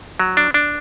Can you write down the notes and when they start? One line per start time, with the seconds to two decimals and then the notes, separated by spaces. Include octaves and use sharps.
0.20 F#3
0.37 D4
0.54 D4